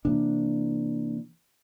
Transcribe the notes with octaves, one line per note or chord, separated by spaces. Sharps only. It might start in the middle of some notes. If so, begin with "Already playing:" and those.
C3 E3 A#3 D4